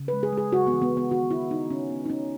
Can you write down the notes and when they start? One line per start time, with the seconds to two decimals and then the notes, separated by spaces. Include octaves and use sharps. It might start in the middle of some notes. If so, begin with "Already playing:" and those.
Already playing: C#3
0.08 G#3 B4
0.23 G#4
0.33 G#3
0.38 G#4
0.53 C#3 F#4
0.67 B3
0.72 E3
0.82 B3
0.92 C#3
0.97 B3
1.11 D#3 F#4
1.31 D#3 E4
1.50 D#3 D#4
1.70 C#3 C#4
1.90 C#3 B3
2.06 D#4
2.10 C#3 C#4